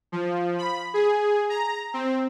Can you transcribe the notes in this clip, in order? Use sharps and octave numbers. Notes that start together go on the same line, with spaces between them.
F3
B5
G#4
A#5
C4